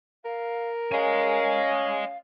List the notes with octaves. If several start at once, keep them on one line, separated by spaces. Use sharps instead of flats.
A#4 F5
C#4 D#5 F5 G#5